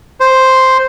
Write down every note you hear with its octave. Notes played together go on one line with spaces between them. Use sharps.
C5